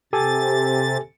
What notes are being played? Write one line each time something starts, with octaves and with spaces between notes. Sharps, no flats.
C3 G4 A4 G#5 A6